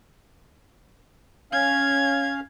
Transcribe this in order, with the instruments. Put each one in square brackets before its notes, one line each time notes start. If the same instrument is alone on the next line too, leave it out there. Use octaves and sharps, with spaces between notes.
[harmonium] C#4 F5 [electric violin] G#6